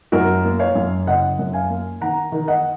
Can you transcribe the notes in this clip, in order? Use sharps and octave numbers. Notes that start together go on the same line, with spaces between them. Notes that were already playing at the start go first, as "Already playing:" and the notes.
F#2 F#4 A#4
A#3
C#5 F5
F#2
F#1 D#5 F#5
F#2
F5 G#5
A#3
D#3 F#5 A#5
D#3
D#5 F#5